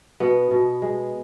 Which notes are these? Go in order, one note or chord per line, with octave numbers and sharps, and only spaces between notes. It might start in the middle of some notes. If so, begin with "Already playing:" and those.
B2 B3
B2
G#3